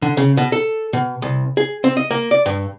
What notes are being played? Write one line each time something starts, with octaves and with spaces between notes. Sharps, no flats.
D3
C#3
B2
A4
B2
C2
G#4
C4
D#5
A#3
D5
G2